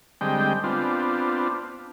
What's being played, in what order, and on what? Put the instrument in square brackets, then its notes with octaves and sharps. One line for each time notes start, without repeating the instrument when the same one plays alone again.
[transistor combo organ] D3 G3 G#3 C4 D#5 G5
B3 C4 D4 F4